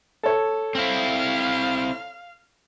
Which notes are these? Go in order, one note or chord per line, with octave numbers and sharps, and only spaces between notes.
A4 C#5
C4 E4 F5